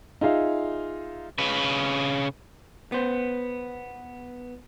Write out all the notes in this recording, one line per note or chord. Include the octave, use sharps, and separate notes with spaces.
D#4 F4 G#4 E5 F5
C#3 B4
B3 C5